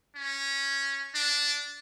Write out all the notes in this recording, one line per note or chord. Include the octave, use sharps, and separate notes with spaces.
C#4
D4